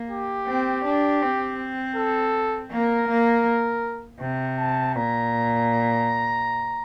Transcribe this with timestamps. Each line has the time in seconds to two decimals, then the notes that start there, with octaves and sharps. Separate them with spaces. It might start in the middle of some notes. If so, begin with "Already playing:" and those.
Already playing: A#3
0.09 G4
0.47 C4
0.85 D4
1.22 C4
1.96 A4
2.71 A#3 A#4
3.08 A#3
4.21 C3
4.58 A5
4.95 A#2 A#5